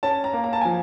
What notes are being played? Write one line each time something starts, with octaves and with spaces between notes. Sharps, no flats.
C#4 A5
A#5
A#3
A#5
A5
G#5
F3